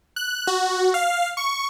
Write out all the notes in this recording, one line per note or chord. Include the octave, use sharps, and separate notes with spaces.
F#6
F#4
F5
C#6